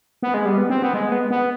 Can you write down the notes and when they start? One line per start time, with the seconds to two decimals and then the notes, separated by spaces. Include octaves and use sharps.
0.23 B3
0.34 G#3
0.45 G3
0.58 B3
0.70 C4
0.82 B3
0.94 G#3
1.12 B3
1.31 B3